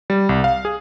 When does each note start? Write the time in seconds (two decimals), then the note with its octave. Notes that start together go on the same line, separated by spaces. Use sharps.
0.10 G3
0.29 C2
0.44 F5
0.65 G#4